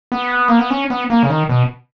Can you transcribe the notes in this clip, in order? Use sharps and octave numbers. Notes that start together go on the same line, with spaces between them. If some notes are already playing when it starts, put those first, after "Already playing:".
B3
A#3
B3
C#4
B3
A#3
C#3
D#3
B2